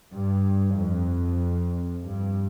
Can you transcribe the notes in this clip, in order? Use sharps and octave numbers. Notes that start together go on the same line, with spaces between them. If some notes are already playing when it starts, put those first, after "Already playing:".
G2
F2
G2